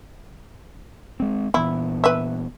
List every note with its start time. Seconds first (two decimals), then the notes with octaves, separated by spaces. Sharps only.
1.20 G#3 C4
1.54 A#2 E3 B3 E4
2.04 B4 E5